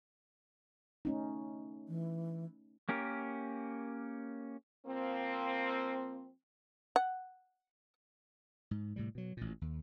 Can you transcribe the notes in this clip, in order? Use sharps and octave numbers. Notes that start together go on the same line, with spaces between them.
A3 C#4 D#4
E3
A#3 C#4 G4 A#4
F3 A#3 C4
F#5
G#2
A2 C3 G3
B2 F#3
A1 A#2
D#2